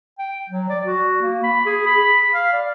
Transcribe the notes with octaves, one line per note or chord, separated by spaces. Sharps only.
G5
F#3
D5
F#4
A#3
B5
G#4
B5
F5
D5